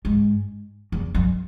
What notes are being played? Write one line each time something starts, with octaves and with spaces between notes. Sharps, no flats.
G#2
E2
F#2